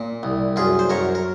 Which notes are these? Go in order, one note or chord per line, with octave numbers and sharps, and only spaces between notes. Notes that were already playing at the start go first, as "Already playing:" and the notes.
Already playing: A#2
C2
F#2 F4 G#4
C5
F#2 A#4 C#5
A#4